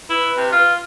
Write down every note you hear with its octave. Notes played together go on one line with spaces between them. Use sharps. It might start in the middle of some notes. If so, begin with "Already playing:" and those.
E4 B4
C3
F4